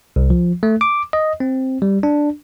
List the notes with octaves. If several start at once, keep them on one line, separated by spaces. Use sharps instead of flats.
C2
F3
A3
D6
D#5
C4
G3
D4